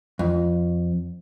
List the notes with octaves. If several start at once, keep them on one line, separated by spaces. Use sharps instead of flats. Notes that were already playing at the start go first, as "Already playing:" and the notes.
F2